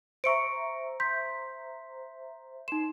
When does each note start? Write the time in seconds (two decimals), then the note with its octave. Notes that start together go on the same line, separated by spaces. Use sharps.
0.24 C5 E5 A#5 C#6 C#7 D7
1.00 C6 G6 B6
2.68 D#4 C6 E7